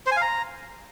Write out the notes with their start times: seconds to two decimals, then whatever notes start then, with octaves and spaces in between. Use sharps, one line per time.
0.06 C5
0.12 G#5
0.17 F5
0.22 A#5